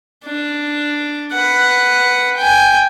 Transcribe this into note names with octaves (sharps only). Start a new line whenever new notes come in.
D4
B4 F#5
G5 G#5